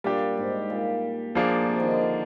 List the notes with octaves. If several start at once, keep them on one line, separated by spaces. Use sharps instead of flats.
A#2 G3 D4 G4
G#2
A#2
F3 A#3 D4 G#4
A#2
C3
D#3
D3
D3